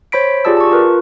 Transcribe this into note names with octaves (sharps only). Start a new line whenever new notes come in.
C5 C#5 B5 B6 D7
F4 G4 G#4 D5 A5 E6
A5 C#6
F4 A#4 B4